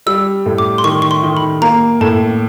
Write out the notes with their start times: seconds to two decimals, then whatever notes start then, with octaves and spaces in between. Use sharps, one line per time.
0.06 G3 E6
0.46 A2
0.58 D6
0.78 C6
0.84 D#3 C#6
1.02 C#6
1.11 C6
1.23 D#3
1.37 B5
1.62 A#3 A#5
2.01 A2 A5